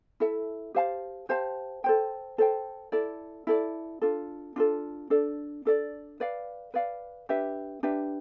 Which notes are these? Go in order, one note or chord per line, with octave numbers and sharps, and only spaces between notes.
E4 A4 E5
G4 C5 F5 A5
G4 C5 F5 A5
A4 C5 G5
A4 C5 G5
E4 A4 D5
E4 A4 D5
D4 F4 A4
D4 F4 A4
D4 A4 D5
D4 A4 D5
B4 D5 F5
B4 D5 F5
D4 G4 B4 E5
D4 G4 B4 E5